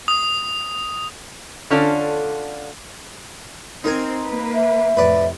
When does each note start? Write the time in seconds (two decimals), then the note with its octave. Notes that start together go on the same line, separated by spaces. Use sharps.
0.08 D#6
1.71 D3 C#4 F4 A4 D5
3.84 C4 D#4 A#4 G#5
4.24 A#3 B4
4.55 E5
4.97 F2 A2 C3 B4 D5